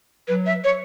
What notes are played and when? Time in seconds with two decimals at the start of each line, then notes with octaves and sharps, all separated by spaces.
0.28 F#3 B4
0.46 E5
0.64 C#5